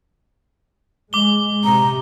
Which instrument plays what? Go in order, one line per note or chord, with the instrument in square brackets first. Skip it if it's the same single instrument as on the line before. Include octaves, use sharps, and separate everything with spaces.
[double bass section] G#3 [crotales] D6 G7
[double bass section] C3 [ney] A#5